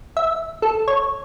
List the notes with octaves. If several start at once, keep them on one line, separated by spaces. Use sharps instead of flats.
E5
A4
C#5